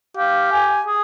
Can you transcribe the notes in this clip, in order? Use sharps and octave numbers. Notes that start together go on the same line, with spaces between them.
G4 F5
G#5
G#4